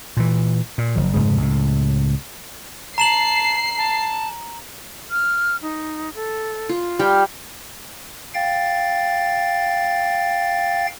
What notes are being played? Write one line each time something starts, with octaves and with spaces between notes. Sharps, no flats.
A#2 E3
A#2
F#1 F3
F1 G#2 C#3 G#3
C#2 A2
A5 A#5 C7 E7 F#7
A5
F6
D#4
A4
F4
G3 G5 F6
F5 G5 A6